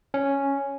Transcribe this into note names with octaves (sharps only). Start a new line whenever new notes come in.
C#4